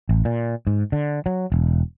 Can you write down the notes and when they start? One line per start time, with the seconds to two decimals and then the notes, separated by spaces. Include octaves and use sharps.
0.09 A1
0.25 A#2
0.67 G#2
0.92 D3
1.26 F#3
1.52 E1